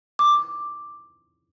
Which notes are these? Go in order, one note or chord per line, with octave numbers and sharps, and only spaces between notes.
D6